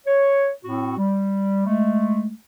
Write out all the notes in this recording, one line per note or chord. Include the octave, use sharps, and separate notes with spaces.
C#5
A2 C4 F#4
G3
G#3 A3